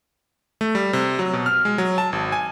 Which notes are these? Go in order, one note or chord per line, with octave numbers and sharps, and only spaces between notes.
A3
G3
C3
F#3
B2
F6
G#3
F#3
A5
G#1
G#5